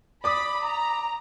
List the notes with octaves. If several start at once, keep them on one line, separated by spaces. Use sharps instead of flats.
D5 B5 D6 D#6
A#5